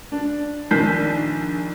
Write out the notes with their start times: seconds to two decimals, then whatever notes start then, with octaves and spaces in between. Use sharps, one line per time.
0.12 D4
0.71 A#1 D#3 D4 G6 B6 C7